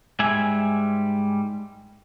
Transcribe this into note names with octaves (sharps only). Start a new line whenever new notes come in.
G#2 G3 G#3 E5 G#5